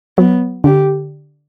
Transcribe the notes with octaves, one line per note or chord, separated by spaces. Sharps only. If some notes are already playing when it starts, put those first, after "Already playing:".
F#3 B3
D3 G4